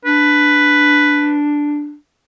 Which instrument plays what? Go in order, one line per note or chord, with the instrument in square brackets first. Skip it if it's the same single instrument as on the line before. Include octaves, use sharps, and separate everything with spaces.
[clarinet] D4 [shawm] B4